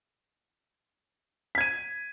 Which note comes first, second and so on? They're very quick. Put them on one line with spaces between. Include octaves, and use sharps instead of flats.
B6 G#6 D#7